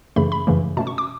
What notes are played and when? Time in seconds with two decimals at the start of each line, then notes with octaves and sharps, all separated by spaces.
0.16 F#2 C#3 E3 A3 B5
0.32 B5
0.47 F#2 C#3 E3 A3
0.77 B2 A3 C#4 A5
0.87 C#6
0.98 D6